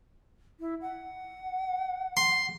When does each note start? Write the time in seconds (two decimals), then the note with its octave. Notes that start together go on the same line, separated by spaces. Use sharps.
0.60 E4
0.81 F#5
2.17 C6